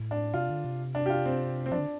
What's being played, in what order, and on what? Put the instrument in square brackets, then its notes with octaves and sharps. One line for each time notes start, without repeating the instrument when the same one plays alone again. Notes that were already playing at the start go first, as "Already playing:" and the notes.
Already playing: [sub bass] A2
[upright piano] D4
[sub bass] C3 [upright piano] F4
[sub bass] D3
C3
[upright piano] D4
G4
F4
C4
C4
[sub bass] F3 [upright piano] D4
[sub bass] D3